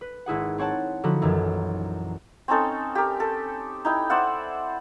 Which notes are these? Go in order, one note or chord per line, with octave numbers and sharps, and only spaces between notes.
B4
G#1 E4 G#4 F#5
C4 C#5 F#5 A5
D3 F3 D#4 F#4 B5
A#1 F#2 D#3 E3
C4 C#4 D#4 A4
G4 A#4
A4
D#4 E4 G5
C5 D5 E5 F#5